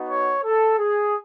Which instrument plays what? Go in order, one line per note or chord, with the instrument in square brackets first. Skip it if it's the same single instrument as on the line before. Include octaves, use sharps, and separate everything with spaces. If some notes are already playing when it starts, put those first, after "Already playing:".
Already playing: [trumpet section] B3 D#4 F#4
C#5
A4
G#4